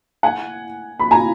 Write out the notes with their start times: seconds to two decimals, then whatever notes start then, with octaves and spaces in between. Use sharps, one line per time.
0.23 F#5 G#5
0.99 B5
1.11 G#5 A#5